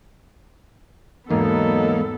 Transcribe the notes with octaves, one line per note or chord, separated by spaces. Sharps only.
E2 G#2 F#3 A#3 B3 D#4 A4